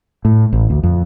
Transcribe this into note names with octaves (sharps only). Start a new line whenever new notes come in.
A2
A1
D2
F2